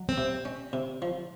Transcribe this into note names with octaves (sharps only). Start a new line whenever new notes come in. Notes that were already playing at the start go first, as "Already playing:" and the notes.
Already playing: F#3
C4
C3
C#4
C3
F3